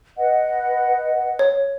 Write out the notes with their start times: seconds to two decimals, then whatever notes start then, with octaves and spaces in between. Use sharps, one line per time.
0.17 B4 D#5 F#5
1.39 C#5